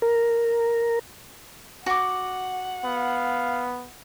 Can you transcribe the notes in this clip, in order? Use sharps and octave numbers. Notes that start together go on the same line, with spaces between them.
A#4
F#4 F#5 D6
B3 F5